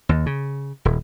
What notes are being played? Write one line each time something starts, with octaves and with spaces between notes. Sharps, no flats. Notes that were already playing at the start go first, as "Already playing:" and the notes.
D#2
C#3
D#1